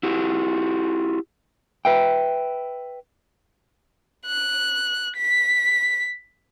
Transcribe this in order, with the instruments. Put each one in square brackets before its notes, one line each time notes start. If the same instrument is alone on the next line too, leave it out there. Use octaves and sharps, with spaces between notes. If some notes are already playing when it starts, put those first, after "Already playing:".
[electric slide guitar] E4 F#4 G4
[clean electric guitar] B4 E5 G5
[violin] F#6
B6